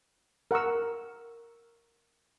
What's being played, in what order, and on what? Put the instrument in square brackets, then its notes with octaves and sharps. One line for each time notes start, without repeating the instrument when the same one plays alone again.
[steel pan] A#4 F#5 A#5 C#6 E6